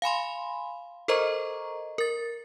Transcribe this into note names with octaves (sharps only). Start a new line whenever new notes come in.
F5 G#5 B5 C6
A4 A#4 C5 D#5 A#5 C#6
A#4 A6